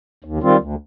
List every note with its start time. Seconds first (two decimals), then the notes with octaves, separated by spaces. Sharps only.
0.24 D#2
0.42 D#3 G3 C4 F4
0.61 D2